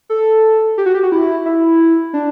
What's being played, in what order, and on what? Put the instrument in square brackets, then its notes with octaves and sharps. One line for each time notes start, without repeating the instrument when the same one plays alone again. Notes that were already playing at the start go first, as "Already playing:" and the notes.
[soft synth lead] A4
G4
F#4
G4
F#4
E4
E4
D4